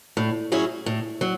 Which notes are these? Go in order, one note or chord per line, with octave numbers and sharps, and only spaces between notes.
A2
F#3 C#4 E4 G#4
A2
F#3